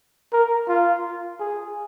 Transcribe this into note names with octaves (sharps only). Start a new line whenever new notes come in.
A#4
F4
G#4